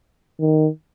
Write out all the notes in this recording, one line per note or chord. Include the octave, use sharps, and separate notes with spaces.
D#3